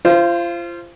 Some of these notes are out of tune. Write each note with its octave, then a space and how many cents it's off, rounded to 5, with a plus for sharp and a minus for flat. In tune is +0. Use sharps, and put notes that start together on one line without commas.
F4 -30 C5 +5